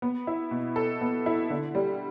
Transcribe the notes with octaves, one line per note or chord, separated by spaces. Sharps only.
B3
E4
B2
A4
B3
E4
D3
G3